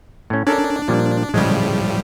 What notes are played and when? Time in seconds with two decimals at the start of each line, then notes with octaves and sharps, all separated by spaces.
0.30 A2 C#4
0.47 C#4 D4 A4 A#4
0.88 A#2 F3 G3
1.34 A2 C#3 F3 G3 G#3